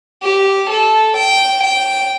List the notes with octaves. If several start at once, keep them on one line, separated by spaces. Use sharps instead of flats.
G4
A4
G5
G5